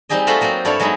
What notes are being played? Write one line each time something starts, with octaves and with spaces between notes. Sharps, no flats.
G3 C4 D#4 G4 G#4 D#5
A3 F4 F#4 A4 C5 B5
F#3 A#3 C4 F4 F#4
G2 E4 A4 C#5 D5 F5
F#3 G#3 B3 D#4 E4